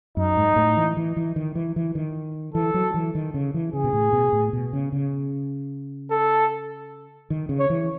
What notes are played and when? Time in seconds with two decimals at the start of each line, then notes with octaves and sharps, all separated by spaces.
0.17 F#2 D#4
0.37 G#2
0.56 A2
0.77 E3
0.97 E3
1.17 E3
1.36 D#3
1.55 E3
1.76 E3
1.95 D#3
2.54 E3 A4
2.74 F#3
2.94 E3
3.15 D#3
3.34 C#3
3.54 E3
3.73 C#3 G#4
3.84 B2
3.93 A2
4.13 B2
4.33 A2
4.53 B2
4.73 C#3
4.92 C#3
6.10 A4
7.30 D#3
7.49 C#3
7.59 C#5
7.70 E3